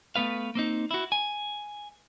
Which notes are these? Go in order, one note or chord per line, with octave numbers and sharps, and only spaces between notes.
A3 B3 B4 F5
A#3 C4 D#4
E4 F#4
G#5